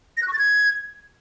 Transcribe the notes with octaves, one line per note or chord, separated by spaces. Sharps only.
A#6
F#6
C#6
A6
G#6